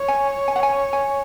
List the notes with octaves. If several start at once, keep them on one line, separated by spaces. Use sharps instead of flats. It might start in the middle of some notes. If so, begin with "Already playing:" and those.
Already playing: C#5
G#5
G#5
F#5
G#5
G#5